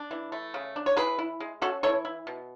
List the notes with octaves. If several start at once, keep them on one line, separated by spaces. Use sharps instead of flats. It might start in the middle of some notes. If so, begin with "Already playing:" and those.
Already playing: D4
E3
A3
C#3
D4
C#5
E3 G#4 B4
E4
G#3
C#4 F#4 A4
E3 A4 C#5
E4
B2